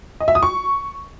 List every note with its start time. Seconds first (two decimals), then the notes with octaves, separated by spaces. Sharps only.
0.20 D#5
0.28 E5
0.35 D#6
0.43 C#6